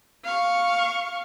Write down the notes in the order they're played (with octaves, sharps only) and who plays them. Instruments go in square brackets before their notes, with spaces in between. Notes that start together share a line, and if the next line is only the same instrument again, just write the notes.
[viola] F5 C#6